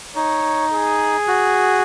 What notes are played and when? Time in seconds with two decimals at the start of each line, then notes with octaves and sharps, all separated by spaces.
0.15 D#4 C#5
0.71 G#4
1.28 F#4